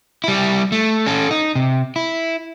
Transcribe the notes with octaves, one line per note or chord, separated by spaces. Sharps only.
G3 E4
A3
C#4 A4
D#4
C3
E4